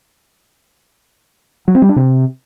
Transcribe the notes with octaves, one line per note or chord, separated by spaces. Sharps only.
F#3
C4
G3
D4
C3